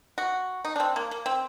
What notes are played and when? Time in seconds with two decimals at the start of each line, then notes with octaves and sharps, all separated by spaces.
0.18 F#4
0.65 D#4
0.76 D4
0.80 C4
0.96 A#3
1.11 A#3
1.26 C4